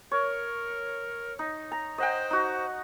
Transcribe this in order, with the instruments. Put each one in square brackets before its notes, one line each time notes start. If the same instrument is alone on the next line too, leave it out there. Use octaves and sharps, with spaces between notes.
[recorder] A#4 [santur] C#5
[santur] D#4
A#5
[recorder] C5 [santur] D#5 F#5 G5
[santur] D#4 F#4